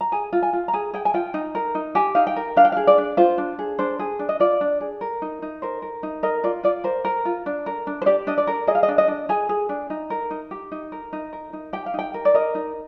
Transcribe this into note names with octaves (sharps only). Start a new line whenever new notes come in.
A#5
G#4 G#5
F4
G#5
F4
A#5
G#4 G#5
G#4 G5
G#5
F4 G5
D#4
A#4
D#4
G4 G#5
D#4 F5
G5
A#4
D4 F5
G5
F5
G#4
D5
D4
F4 C5
D4
G#4
D4 C5
G#4
D4
D#5
F4 D5
D4
G#4
A#4
D#4
D#4
A#4 C5
A#4
D#4
A#4 D#5
F4 D5
F4 D5
A#4 C5
A#4
F4
D4
A#4
D4
C5
G4 D5
D4 D#5
D5
A#4
G#4 D#5
F5
D#5
D4
D#5
D4
G#4 G#5
G#4
D4
D#4
A#4
D#4
G4
D#4
A#4
D#4
A#4
D#4
G4 G5
F5
D#4 G5
A#4
D5
A#4 D#5
D#4